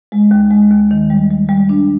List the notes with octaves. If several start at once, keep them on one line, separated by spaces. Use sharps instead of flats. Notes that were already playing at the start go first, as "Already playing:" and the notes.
G#3
D#2
G#3
D#2
D#3
G3
G3
G3
D4